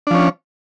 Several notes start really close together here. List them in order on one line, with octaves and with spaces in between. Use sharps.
D4 F3 C#4